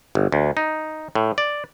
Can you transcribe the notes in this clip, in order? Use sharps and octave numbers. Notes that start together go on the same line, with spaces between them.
G1
D2
D#4
A2
D5